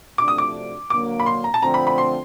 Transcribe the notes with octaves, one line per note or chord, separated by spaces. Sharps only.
C3 F3 A3 D4 F#4 D6
D#6
D6
D3 F#3 A#3 D4 D6
B5
C6
A#5
A5
D3 F3 A3 C4 A#5
B5
B5
C6